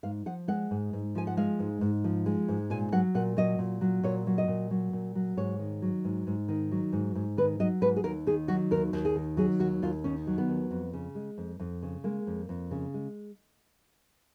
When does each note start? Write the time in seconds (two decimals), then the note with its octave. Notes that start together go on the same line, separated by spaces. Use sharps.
0.03 G#2 F5
0.26 F3 F#5
0.48 G#3 F#5
0.71 G#2
0.93 G#2
1.15 F3 G#5
1.27 F#5
1.37 G#3 F5
1.59 G#2
1.81 G#2
2.04 F3
2.26 G#3
2.48 G#2
2.70 A#2 G#5
2.92 F#3 F#5
3.15 A#2 F#5
3.37 F#3 D#5
3.59 A#2
3.81 F#3
4.03 A#2 C#5
4.27 F#3
4.38 D#5
4.48 A#2
4.71 F#3
4.93 A#2
5.15 F#3
5.37 G#2 C#5
5.59 D#3
5.82 F#3
6.04 G#2
6.27 G#2
6.48 D#3
6.71 F#3
6.93 G#2
7.15 G#2
7.37 D#3 B4
7.60 F#3 D#5
7.81 G#2 B4
7.96 G#4
8.04 D#2 A#4
8.27 D#3 G#4
8.48 F#3 F#4
8.71 D#2 A#4
8.93 D#2
9.05 G#4
9.16 D#3
9.37 F#3 G#4
9.60 D#2 F#4
9.82 D#2 F4
10.04 D#3 C#4
10.27 F#3
10.38 B3
10.48 D#2
10.71 F2
10.93 C#3
11.15 G#3
11.38 F2
11.59 F2
11.83 C#3
12.04 G#3 A#3
12.27 F2
12.49 F2
12.71 C#3
12.94 G#3